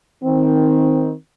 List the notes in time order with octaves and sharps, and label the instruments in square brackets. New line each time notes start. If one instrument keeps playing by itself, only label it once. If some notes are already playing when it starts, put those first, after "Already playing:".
[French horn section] D#3 C4